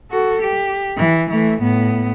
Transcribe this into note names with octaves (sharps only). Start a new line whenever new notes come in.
F#4 A4
G4
E3
E3 A3
A2 B3